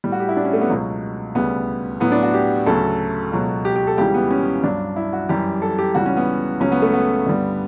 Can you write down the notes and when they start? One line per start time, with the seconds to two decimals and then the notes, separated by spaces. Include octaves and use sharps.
0.04 A2 G3
0.12 F#4
0.20 G4
0.29 E4
0.37 D4
0.45 C#4
0.53 A3
0.61 B3
0.70 C#2 B2 F#3
1.35 D2 C#3 G3 B3
2.00 A2 F#3 B3
2.12 D4
2.23 F#4
2.34 G4
2.66 D2 C#3 F#3 A4
3.32 C#2 B2 F#3
3.65 G4
3.76 G4
3.87 A4
3.98 C#2 C#3 E3 G3 G4
4.14 B3
4.31 C#4
4.64 G2 F#3 D4
4.96 E4
5.13 F#4
5.29 F#2 E3 G3 G4
5.62 A4
5.78 G4
5.95 C#2 C#3 E3 G3 F#4
6.06 C#4
6.17 B3
6.60 C#2 C#3 F#3 C#4
6.72 B3
6.82 A3
6.94 B3
7.26 G2 D3 G3